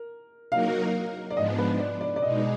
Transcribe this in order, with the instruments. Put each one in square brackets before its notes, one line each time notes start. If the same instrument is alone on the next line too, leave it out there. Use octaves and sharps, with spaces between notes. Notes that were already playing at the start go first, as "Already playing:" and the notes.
Already playing: [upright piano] A#4
[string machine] F#3 A#3 D#4 F#4 A#4 [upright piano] F5
[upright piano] D5
[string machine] G#2 F3 G#3 B3 D4 [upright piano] D#5
[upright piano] B4
D5
D5
D5
[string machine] B2 G#3 D#4 [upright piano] D#5